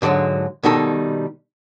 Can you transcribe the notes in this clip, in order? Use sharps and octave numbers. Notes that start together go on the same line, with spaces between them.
G#2 D3 E3 F#3 G#3
B2 D#3 G3 D#4 A4